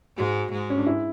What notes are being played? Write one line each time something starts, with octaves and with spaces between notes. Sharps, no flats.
G#2 G#3 F#4
G#2 G#3
C#4
D4
E4